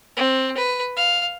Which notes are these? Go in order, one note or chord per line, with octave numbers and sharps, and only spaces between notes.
C4
B4
F5